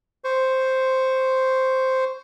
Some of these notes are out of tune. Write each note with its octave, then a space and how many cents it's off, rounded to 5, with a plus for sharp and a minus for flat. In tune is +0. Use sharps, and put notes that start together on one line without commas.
C5 +0 C#6 +0